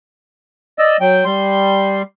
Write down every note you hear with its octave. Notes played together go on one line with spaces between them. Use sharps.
D5 D#5 E6
F#3 G5
G3 C6